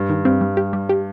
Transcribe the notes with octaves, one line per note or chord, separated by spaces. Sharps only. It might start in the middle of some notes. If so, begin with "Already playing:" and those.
Already playing: G2
D#3
G2 C4
G3
G4
G3
G4